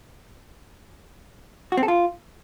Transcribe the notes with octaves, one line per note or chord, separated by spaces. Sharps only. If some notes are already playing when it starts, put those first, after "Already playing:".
F#4
C4
A4
F4